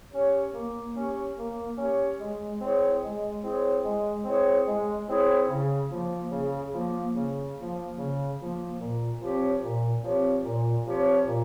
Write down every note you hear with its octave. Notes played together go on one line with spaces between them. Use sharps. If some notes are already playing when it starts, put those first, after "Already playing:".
C#4 G4 C#5
A#3
C#4 G4 C#5
A#3
C#4 G4 C#5
G#3
C4 E4 G#4 C#5
G#3
C4 E4 G#4 C#5
G#3
C4 E4 G#4 C#5
G#3
C4 E4 G#4 C#5
C#3
F3 A#3
C#3
F3 A#3
C#3
F3 A#3
C#3
F3 A#3
A#2
F3 C4 G4 C#5
A#2
F3 C4 G4 C#5
A#2
F3 C4 G4 C#5
A#2